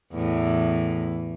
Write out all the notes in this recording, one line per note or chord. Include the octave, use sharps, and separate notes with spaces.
E2 A2 E3